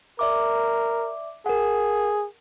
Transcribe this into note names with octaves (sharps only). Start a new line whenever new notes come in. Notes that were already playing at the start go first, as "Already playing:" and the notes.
A#4 D5 E5 D6
G#4 A#4 F#5